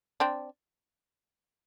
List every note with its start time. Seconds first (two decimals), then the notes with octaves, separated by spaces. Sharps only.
0.20 C4 D4